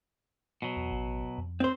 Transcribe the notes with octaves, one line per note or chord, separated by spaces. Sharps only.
B2 F#3
E2
A1
F2
C4 C5